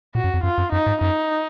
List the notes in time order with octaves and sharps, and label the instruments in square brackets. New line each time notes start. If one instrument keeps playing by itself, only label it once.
[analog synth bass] A#2 [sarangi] F#4
[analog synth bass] F#2
F2
[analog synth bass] F#2 [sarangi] F4
[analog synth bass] F#2
[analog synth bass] F#2 [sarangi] D#4
[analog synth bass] G#2
[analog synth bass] F#2 [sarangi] D#4